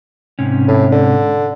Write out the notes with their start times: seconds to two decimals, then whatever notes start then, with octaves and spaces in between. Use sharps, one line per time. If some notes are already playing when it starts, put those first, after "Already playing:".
0.39 G#2 C3 C#4
0.68 A2
0.92 D3